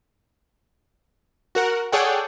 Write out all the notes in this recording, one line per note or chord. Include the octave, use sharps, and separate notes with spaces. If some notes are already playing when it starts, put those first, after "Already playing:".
F#4 A#4 F#5
G#4 A4 C#5 D5 F#5 G5